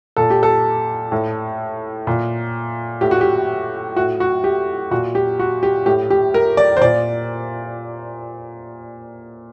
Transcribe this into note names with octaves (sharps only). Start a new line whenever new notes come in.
A#2 A4
G4
A4
A2
A#2
A2 G4
F#4
G4
A2 F#4
F#4
G4
A#2 F#4
G4
F#4
G4
A2 G4
G4
A#4
D5
C5
A#2 D5